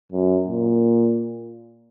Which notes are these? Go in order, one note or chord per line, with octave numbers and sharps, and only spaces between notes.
F#2
A#2